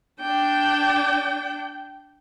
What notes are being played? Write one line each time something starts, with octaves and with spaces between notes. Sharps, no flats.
D4 G5